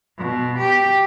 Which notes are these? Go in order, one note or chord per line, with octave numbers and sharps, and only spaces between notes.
B2
G4